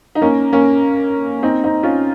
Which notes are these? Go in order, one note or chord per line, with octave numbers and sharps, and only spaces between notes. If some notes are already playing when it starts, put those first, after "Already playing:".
D#4
A#3 C#4
A#3 C#4
C4 D#4
C4 D#4
C#4 F4